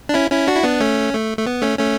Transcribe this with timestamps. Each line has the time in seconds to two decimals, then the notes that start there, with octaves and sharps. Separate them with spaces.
0.09 D4
0.14 C#4 E4
0.31 C#4 E4
0.47 D4 F#4
0.57 E4
0.63 B3 D4
0.80 A3 C#4
1.13 A3
1.38 A3
1.46 B3
1.62 A3 C#4
1.79 A3 C#4